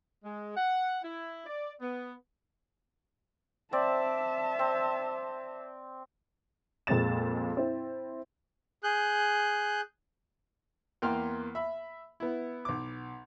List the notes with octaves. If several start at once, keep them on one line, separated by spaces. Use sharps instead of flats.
G#3
F#5
E4
D5
B3
C4 D5 E5 A5
C4
F2 A#2 G#3 C4 A6 E7
C4 E4
G#4 F#6 G6
E2 E3 A#3 G5 C6 F6
E5 B5
B3 E4
B1 D6